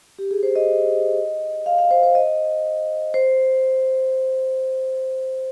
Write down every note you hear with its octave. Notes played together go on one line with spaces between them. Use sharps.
G4
G#4
C5
D#5
F5
F5
C5
C5
D#5
C5